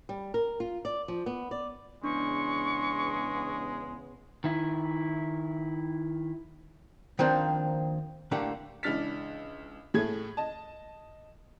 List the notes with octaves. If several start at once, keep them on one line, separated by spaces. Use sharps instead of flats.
G3
A#4
F4
D5
F3
B3
D5
E2 C#3 G#3 B3 D4 C#6
D#3 E4
D#3 F3 A#3 C4 D4 C5
A2 D3 A3 A#3 D4 G4
C#2 E3 D4 F6 A6 B6
A2 A3 G#4 G#6
D#5 A5